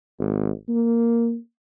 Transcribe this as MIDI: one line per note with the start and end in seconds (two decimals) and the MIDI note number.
0.20 0.49 32
0.68 1.36 58